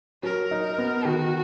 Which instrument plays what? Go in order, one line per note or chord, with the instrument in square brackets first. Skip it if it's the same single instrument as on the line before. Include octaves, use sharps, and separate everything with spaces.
[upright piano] F#3 [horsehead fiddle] A#4
[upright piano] D#4
B3
[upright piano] D#3 [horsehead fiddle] F#4